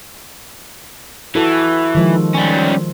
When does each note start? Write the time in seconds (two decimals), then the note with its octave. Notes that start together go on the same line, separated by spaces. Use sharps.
1.35 E3 F#4 A4
1.95 D#3 F3 G#3
2.34 G3 C#4